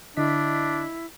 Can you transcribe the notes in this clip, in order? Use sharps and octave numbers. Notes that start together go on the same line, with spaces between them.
D3 D4 E4 D#5 B6